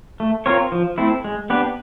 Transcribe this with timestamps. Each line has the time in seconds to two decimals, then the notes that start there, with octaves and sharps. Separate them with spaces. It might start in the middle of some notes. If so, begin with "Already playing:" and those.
0.20 A3
0.46 C4 F4 A#4 C#5
0.72 F3
0.98 A3 C4 E4
1.24 G#3
1.50 B3 D4 G4 B4